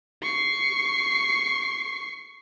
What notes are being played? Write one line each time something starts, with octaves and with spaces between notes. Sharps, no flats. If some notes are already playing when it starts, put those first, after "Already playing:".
C#6 C7